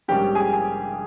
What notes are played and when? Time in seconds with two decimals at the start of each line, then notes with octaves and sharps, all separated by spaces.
0.08 A#1 G#2 G3 A#3 C#4 G4 G5
0.35 G#4 G#5
0.53 G#5